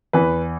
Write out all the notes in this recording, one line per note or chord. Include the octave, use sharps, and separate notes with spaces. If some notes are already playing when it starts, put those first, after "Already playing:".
E2 E3 B4